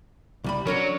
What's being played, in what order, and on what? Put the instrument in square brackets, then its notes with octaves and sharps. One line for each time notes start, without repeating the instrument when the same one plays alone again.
[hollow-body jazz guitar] C2 G3 B5
[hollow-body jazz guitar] D3 C#4 A#4 [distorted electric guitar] F#3